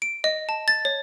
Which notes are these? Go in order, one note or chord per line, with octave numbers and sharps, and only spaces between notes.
D7
D#5
A5
A6
C#5